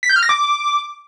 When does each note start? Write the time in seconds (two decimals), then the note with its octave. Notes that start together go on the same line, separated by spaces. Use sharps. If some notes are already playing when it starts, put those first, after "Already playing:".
0.03 B6
0.09 G6
0.16 F6
0.23 A#6
0.29 D6